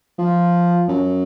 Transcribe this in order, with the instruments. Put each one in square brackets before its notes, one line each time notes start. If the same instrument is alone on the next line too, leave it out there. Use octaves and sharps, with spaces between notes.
[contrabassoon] F3
F#2